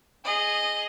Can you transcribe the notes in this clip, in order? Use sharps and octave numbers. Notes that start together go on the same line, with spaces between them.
G#4 D#5